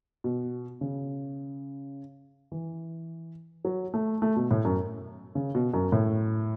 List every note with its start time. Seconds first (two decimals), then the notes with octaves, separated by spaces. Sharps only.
0.24 B2
0.81 C#3
2.52 E3
3.65 F#3
3.94 A3
4.22 A3
4.36 B2
4.51 A2
4.65 F#2
5.35 C#3
5.55 B2
5.73 F#2
5.92 A2